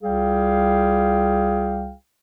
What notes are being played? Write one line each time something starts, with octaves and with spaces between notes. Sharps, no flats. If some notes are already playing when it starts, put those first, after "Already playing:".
C2 G3 F4 G#4 F5 G5